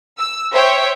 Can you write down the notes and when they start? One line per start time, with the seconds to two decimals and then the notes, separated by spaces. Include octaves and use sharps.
0.19 E6
0.52 C5 C#5 E5 G5